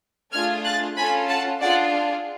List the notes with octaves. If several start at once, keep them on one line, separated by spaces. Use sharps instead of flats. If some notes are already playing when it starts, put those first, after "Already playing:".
A3 D4 F4 G#4 F6 G#6
F#6 A6
C#4 F4 A4 G#5 B5
F#5 A5
D4 F4 G#4 D5 F#5